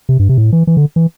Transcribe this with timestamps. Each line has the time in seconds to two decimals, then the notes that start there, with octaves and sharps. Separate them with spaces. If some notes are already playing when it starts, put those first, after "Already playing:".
0.09 C3
0.19 G2
0.29 C3
0.38 A2
0.53 E3
0.67 E3
0.77 D3
0.96 E3